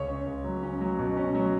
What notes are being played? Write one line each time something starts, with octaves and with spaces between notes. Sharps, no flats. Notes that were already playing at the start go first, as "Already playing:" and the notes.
Already playing: C#2 C#5
C#4
C#2
F#3
C#4
F#3
B2
C#4
F#3